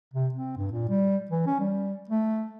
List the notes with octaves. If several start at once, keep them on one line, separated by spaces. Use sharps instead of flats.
C3
C4
G2
A#2
G3
E3
C#4
G3
A3